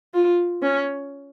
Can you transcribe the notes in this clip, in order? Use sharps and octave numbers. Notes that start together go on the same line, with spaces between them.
F4
C#4